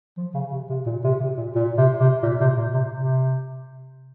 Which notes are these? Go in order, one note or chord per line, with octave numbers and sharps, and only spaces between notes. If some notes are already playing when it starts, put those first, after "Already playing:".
F3
C#3
C3
C3
A#2
C3
C3
A#2
A#2
C3
C3
A#2
C3
A#2
C3
C3